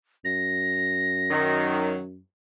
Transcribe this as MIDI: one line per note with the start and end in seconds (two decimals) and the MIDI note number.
0.25 2.20 42
0.25 1.66 94
1.30 1.99 51
1.30 1.99 54